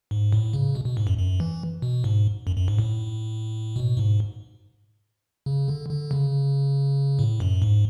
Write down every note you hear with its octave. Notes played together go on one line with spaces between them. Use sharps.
G#2
A2
C#3
B2
B2
G#2
F#2
F#2
E3
B2
G#2
F#2
F#2
G#2
A2
B2
G#2
C#3
D3
D3
C#3
A2
F#2
G#2